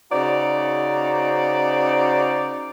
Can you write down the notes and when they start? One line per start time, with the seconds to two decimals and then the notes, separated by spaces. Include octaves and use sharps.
0.12 C#3 D#4 F#4 C5 D5